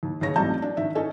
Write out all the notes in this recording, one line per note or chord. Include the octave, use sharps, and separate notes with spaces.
D#2
D#2 C#3 C#5 A#6
A1 F#3 G3 C4 A5 G6
D4
D#3 E5
C#4 D#4 A4 D#5 G#5